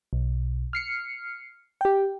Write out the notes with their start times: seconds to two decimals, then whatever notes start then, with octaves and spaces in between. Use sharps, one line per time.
0.13 B1
0.73 F6 C7 C#7
1.81 G4 G5